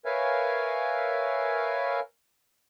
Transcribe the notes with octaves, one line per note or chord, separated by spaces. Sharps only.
A#4 B4 C#5 E5 F5 G#5